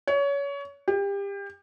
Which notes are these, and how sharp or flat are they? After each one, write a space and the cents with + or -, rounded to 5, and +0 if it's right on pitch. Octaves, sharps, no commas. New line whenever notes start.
C#5 +25
G4 +30